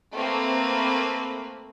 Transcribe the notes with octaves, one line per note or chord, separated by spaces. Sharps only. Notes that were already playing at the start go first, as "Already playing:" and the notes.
A3 A#3 C4 B4